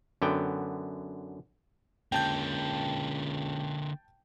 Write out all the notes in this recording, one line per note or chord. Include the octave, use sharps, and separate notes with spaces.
F#2 D3 B3 G5
C#2 D3 A#3 G5 A5 G6